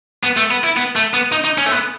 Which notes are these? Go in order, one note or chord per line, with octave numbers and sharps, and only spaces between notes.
B3
A3
B3
E4
B3
A3
B3
D#4
D#4
C#4
A3
B3